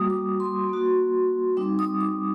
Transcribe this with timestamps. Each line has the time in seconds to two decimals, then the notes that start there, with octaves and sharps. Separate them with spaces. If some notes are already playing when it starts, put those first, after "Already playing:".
Already playing: G3 A#3 F#4 D#6
0.10 D6
0.40 C6
0.69 A#3 F#4
1.57 G3 C4 D#4 D6
1.79 D#6
2.01 D6